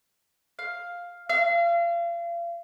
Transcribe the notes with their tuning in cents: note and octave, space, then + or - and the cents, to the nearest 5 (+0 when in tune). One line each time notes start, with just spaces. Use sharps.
F5 +5
F5 -35